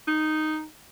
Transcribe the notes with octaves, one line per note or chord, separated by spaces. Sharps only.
D#4